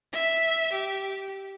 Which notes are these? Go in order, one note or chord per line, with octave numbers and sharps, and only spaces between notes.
E5
G4